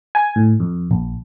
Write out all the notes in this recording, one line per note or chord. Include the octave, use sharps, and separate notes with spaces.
G#5
A2
F2
A#1